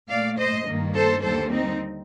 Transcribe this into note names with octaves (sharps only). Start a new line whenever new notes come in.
A#2 A3 D5 F5
C5 D#5
G2 D#3 A#3
A4 C5
D#2 D3 G3 A#3 A4 C5
C4 D#4